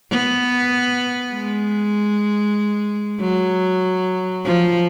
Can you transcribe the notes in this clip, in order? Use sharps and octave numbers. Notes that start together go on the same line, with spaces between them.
B3
G#3
F#3
F3